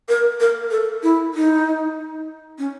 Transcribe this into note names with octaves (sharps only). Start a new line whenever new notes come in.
A#4
A#4
A4
E4
D#4
C#4